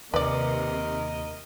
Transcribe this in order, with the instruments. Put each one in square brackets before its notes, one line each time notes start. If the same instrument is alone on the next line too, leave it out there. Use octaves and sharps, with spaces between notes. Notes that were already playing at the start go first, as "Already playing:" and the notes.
[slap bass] D#2 [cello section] C3 [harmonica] A#4 D#5 [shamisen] B4 D5